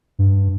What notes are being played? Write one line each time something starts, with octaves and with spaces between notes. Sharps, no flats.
G2